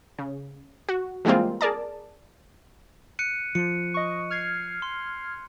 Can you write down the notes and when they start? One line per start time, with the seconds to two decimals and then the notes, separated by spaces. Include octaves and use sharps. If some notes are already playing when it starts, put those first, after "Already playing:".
0.18 C#3
0.89 F#4
1.25 E3 G3 G#3 A#3 C4 F4
1.61 G#4 A#4 D5 A5
3.19 F#6 C#7 D#7
3.55 F3 C#7
3.94 D#5 C#6
4.30 F6 G#6 C7
4.82 C6